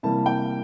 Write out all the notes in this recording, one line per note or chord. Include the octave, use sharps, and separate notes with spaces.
C3 E3 G3 A#3 A5
G5